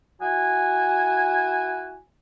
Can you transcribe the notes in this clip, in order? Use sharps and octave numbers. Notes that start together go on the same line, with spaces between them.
E4 F#4 G#5